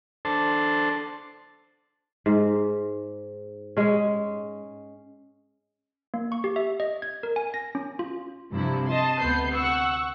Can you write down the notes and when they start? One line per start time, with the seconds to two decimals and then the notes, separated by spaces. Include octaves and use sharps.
0.25 D4 A4 C5 A5
2.26 G#2
3.77 G#3 C#4
6.14 A#3
6.32 C#6
6.44 G4
6.56 E5
6.80 D#5
7.02 G#6
7.23 A#4
7.36 G#5
7.54 A#6
7.75 C#4
7.99 F4
8.53 G2 C3 F3 E4
8.87 D#5 A5 C6
9.19 D2 C3 B3 B4 G6 C7
9.53 F#5 C#6 E6